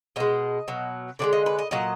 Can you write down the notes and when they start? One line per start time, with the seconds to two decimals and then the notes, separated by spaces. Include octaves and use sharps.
0.16 B2 G#3 D#5
0.68 B2 F#3
1.19 D3 F3 G#3 D5
1.33 D#5
1.46 B4
1.59 D#5
1.71 A#2 F#3 D#5